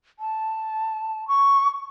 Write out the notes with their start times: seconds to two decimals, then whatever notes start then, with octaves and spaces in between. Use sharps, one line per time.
0.19 A5
1.28 C#6